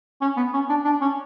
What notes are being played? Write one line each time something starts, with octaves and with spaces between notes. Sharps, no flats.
C#4
B3
C#4
D4
D4
C#4